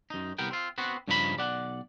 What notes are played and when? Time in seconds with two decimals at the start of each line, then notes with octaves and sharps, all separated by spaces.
0.10 F#2 D#4
0.38 C2 B3 A#4 G5
0.51 C4 F4
0.78 B3 C4 F#4
1.08 G2 C#3 F3 D#4 A#4 B5
1.37 B1 D5 F#5